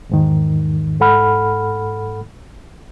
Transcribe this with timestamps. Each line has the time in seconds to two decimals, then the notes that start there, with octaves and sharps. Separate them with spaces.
0.10 E2 G#2 D#3
1.00 G#2 A4 F#5 B5 F6